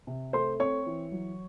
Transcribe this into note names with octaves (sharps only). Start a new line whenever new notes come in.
C3
A3 C5 C6
C4 C#5 C#6
E3
F#3